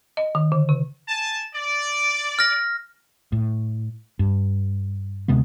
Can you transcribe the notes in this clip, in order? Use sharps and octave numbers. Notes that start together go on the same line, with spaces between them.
D#5
D#3
D3
C#3
G#5 A5
D5
F6 A#6
A2
G2
D2 C3 G#3 B3